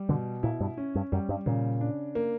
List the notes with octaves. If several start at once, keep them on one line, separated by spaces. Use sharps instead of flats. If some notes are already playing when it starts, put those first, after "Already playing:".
Already playing: G3
B2 D3
A#2 E4
G2
C#4
G2
F#2 G3
G2
A#2 C#3
D4
A#3